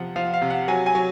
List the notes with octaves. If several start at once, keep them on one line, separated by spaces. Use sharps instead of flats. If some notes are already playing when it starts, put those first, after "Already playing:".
Already playing: C3 F3 F#5
F3 F5
F5
C3
F#5
F#3 G#5
G#5
F#3